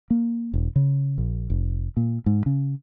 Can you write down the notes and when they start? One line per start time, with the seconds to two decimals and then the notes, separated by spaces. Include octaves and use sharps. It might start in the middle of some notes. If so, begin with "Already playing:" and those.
0.10 A#3
0.54 E1
0.76 C#3
1.18 A#1
1.50 F1
1.97 A#2
2.26 G#2
2.46 C#3